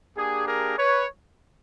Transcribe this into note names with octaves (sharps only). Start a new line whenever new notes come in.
A#3 D4 G4 G#4
G#4 A#4
B4 C#5